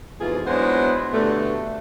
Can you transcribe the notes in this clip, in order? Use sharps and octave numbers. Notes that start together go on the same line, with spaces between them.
F2 G#2 B2 E3 F4 G#4
F#3 G#3 B3 D4 E4 C5
G2 B2 D3 A3